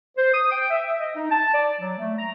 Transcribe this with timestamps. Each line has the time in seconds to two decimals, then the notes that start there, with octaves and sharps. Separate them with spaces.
0.16 C5
0.34 D#6
0.52 G5
0.70 E5
1.00 D#5
1.16 D#4
1.31 A5
1.54 D5
1.80 F#3
1.98 A3
2.18 A#5